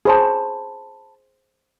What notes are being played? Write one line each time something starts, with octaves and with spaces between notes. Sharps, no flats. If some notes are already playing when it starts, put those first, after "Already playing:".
G#4 C5 C#5 A5 B5